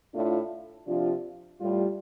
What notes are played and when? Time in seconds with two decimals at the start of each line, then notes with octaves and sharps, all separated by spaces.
0.13 A2 A3 D4 F4
0.86 C3 F3 D4 F4
1.60 A2 G3 F4